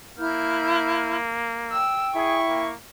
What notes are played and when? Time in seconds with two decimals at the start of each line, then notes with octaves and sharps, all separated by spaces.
0.18 A#3 E4 F6 G6
1.72 G5 E6
2.15 E4 G#4 C#6
2.47 A#3